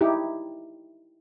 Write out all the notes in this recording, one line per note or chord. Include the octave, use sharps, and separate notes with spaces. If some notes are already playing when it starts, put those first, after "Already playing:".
D#4 E4 G4